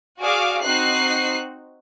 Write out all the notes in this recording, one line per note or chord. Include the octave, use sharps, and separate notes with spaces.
F#4 G#4 D5 F5 D6
C4 D#4 F#4 F#6 C7